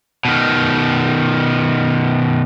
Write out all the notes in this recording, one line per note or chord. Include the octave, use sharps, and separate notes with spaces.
B2 D#3